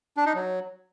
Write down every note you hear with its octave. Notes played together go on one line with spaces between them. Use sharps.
D4
D#4
F#3